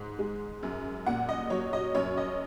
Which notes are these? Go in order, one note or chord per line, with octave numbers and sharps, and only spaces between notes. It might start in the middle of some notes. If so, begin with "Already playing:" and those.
Already playing: G#2
G#3
F#2
A#2 F#5
D#5
F#3 C#5
D#5
F#2 C#5
D#5